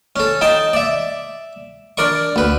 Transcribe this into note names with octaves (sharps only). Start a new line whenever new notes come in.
C#4 A4
D#4 G5 A5
D5 E5
D4 A#4 D5 C#6
D2 B4